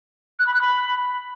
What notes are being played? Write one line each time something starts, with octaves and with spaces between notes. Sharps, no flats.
F#6
B5
F#6
B5